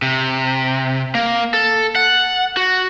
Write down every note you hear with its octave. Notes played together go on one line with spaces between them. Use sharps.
C3
A#3
A4
F#5
F#4